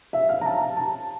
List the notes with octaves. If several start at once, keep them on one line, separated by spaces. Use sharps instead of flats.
E5
F5
A#5
A5
A5
A5